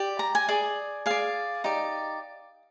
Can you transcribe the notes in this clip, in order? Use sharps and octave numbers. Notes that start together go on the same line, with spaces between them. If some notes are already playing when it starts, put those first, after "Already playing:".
Already playing: G4 D5
A#5
G#5
G#4 D5
G#4 D5 F5
D#4 G4 D5